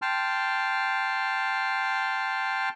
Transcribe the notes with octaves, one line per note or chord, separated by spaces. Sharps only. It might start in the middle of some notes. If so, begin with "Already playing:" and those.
G5 A5 C6 F6